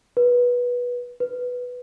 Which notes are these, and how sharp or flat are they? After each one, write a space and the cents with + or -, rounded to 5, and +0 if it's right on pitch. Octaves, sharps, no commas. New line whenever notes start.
B4 -15
B4 +0